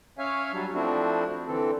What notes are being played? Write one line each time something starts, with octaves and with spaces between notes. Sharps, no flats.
C#4 C#5 E5 F5 G#5
F#3 G3 D4
F3 A3 C4 D4 E4 F#4
D3 E3 C4 A4